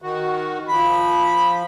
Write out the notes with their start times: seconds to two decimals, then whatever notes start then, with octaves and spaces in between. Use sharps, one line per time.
0.02 D#3 F#4
0.69 F3 B5